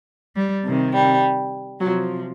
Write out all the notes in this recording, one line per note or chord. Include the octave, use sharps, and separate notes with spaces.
G3
C3 D#3
G3
C3 F3 F#3